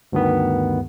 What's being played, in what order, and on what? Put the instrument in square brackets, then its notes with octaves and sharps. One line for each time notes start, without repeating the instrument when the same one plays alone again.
[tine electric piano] D2 G2 D#3 B3